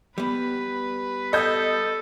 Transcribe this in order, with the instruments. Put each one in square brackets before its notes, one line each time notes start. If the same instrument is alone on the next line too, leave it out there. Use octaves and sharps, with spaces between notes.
[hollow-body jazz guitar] G3 B3 [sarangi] B4
[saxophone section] A4 [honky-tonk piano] D#5 G6